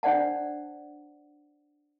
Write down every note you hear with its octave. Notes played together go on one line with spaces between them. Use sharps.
D4 C5 D5 F#5 A5